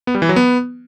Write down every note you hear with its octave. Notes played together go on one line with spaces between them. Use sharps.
B3
G3
E3
F#3
B3